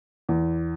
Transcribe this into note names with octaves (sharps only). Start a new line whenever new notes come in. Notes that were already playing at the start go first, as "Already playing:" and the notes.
E2